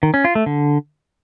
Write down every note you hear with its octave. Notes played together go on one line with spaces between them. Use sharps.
D#3
C#4
F4
A3
D3